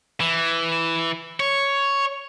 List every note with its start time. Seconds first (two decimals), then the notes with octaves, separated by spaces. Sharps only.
0.20 E3
1.40 C#5